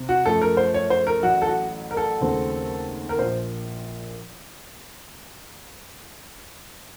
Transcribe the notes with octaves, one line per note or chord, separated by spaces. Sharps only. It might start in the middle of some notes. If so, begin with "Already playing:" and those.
Already playing: C3 C4
F#4
F#2 F3 A3 A4
A#4
C5
C#5
C5
A#4
A1 A2 F#3 F#4
A4
F#4
A#4
A4
D#2 C#3 F#3 A3 C4
A#4
A#1 A#2 F3 C5